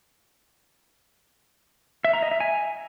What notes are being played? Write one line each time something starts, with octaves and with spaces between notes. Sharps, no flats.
E5
A#5
D#5
E5
G#5